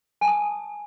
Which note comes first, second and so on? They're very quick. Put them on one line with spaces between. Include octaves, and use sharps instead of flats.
G#5 A5 D#6